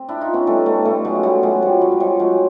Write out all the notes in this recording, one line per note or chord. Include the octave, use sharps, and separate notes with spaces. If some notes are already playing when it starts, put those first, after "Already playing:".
Already playing: C4
D4 E4
D#4 F4
B3 C#4
G3 A3
G3 A3
G3 A3
F#3 G#3
G3 A3
F#3 G#3
F3 G3
F#3
G#3
F3 G3
F#3 G#3